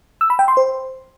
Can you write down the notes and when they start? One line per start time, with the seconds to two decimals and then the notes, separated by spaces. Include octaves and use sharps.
0.21 E6
0.30 B5
0.39 G5
0.48 C6
0.57 C5